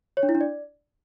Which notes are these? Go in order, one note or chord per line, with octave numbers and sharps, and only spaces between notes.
C#5
D4
E4
D4
D5